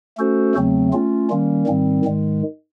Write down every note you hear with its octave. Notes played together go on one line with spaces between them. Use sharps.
A3 C#4 F#4 A4 C5
E2 C#3 F#3 A3 C4
A3 C#4 F4
D#3 G3 A#3 C#4
G#2 D#3 G3 C4
G#2 D#3 G#3